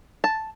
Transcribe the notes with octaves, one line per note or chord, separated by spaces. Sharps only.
A5